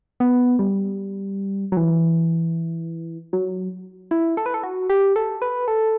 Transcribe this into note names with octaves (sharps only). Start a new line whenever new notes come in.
B3
G3
F#3
E3
F#3
E4
A4
B4
A4
F#4
G4
A4
B4
A4